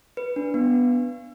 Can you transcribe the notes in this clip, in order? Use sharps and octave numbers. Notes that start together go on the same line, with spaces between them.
B4
D4
B3